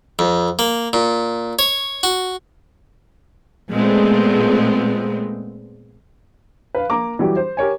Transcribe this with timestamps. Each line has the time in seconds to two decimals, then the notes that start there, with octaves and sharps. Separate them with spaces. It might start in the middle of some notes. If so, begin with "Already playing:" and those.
0.19 F2
0.59 A#3
0.93 A#2
1.59 C#5
2.03 F#4
3.71 A#2 G#3 A3 B3 C4
6.75 B4 F5
6.90 A#3 A#5 D6
7.19 E3 F#3 G3 G4
7.36 C5
7.57 G4 A#4 C#5 G#5